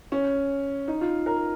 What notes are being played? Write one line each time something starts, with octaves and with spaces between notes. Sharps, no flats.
C#4
D#4
F4
A#4